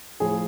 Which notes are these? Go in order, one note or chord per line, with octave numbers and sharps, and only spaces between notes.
A2 F3 G#4